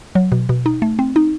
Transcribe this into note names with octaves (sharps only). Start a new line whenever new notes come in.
F#3
B2
B2
D#4
A3
C4
D#4